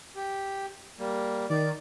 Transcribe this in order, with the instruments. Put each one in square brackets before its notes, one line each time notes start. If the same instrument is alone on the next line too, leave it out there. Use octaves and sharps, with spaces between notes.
[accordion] G4
G3 A#3
[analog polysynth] D#3 [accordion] D5